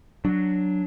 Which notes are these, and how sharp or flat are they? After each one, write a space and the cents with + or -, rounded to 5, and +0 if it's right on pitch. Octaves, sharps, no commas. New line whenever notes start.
F#3 +0 D4 +0